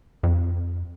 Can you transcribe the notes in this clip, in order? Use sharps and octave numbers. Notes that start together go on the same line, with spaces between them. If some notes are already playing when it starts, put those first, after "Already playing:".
F2